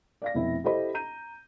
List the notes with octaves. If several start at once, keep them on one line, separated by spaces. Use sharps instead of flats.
D5 F5 A#6
F1 B2 C4 E4
E4 G4 A4 C5 D#5 B5
A#5 G6 D#7